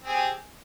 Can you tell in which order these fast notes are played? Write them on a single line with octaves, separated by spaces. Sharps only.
C4 G#4 G4